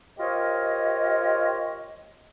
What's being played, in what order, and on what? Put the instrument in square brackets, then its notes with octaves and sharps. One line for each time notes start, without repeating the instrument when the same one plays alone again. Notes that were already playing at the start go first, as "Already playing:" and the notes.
[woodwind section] F4 G4 A#4 C5 C#5 D#5